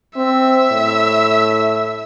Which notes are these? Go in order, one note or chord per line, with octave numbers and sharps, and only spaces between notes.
C4 E5
A2